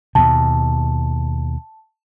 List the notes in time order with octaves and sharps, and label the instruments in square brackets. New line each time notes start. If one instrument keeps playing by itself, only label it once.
[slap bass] D#2 B2 [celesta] A5